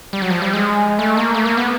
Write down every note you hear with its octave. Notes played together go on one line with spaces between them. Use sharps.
G3
F#3
F3
G3
G#3
A3
A#3
A3
A#3
B3